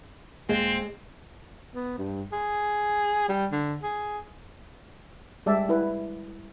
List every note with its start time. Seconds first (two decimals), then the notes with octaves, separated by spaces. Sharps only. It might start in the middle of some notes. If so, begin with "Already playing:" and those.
0.49 D#1 F#2 G#3 A#3 C4
1.75 B3
1.98 G2
2.32 G#4
3.29 G3
3.52 D3
3.83 G#4
5.46 G3 G#3 D5 E5 A5
5.69 E4 B4